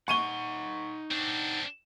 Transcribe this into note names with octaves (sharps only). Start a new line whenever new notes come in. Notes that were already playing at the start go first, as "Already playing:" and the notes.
D#4 F#5 C#6 D#7 G7
C4 D4